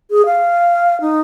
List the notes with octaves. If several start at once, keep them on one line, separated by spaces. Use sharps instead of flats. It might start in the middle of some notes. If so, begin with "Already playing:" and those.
G#4
F5
D#4